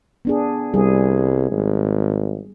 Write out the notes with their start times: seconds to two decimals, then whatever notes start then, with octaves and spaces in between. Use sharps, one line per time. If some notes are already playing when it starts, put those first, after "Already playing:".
0.25 B3 D4 G#4
0.74 C2 G3 G#4
1.52 G#1